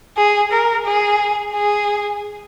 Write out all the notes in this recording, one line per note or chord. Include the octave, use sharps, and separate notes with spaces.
G#4
A#4
G#4
G#4